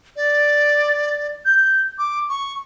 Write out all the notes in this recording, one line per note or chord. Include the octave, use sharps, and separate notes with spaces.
D5
G6
D6
C#6